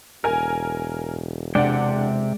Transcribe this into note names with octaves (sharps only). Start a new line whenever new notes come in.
E1 A#4 G#5
C3 G#3 D4 D5 F#5 G5